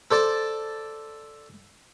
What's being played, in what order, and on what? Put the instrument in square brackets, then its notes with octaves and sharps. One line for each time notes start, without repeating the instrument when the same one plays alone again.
[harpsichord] A4 C5 D5 A5